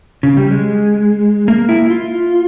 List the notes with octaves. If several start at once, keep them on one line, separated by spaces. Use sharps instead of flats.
C#3
G3
G#3
A#3
E4
F4